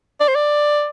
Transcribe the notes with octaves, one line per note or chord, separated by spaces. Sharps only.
D5
C5
D5